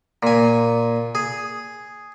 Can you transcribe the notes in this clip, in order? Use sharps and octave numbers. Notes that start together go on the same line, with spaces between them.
A#2 G#5
G#4